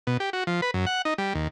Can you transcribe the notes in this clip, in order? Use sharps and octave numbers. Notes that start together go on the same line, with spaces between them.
B2
G4
F#4
F3
B4
F#2
F#5
D#4
G3
D#2